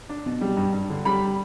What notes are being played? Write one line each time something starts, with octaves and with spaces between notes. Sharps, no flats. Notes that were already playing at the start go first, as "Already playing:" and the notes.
D4
B2
G3
G2
G2
D3
G3 B5